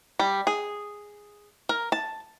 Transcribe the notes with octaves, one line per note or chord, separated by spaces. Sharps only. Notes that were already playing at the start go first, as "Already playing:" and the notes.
G3
G#4
A#4
A5